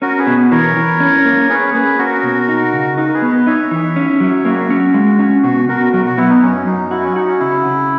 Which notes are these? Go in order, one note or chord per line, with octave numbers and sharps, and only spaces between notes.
C#4 F#4 A#4
G#4 B4
B2
E3 A#4 C#5
E3
C#4
A#3
C#4 G#4 B4
A#3 G#4 B4
C#4 F#4 A#4
B2
D#4
C#3
D#4 F#4 A#4
A#4
G#4 B4
B3
B4 D#5
D#4 C#5 E5
E3
C#4
F#3
A#3 F#4
C#4
G#3
C#4
B2 F#4
B2 F#4 A#4
F#3 F#4 A#4
F#4
B3 E4
D#4
F#2 C#4
F#2 D#4
E4 F#4
C#4
D#4 F#4
C#4
C#3 E4
C#3